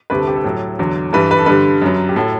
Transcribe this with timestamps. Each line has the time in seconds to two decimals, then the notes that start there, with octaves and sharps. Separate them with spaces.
0.10 D2 C3 G3 B4
0.18 A4
0.28 G4
0.36 A4
0.44 A2 F#3
0.79 E2 D3 F#3
1.13 G2 E3 G3 B4
1.31 B4
1.39 A4
1.46 G2 D3 G3 B4
1.82 F#2 F#3
2.09 G4
2.16 A2 F#3 A4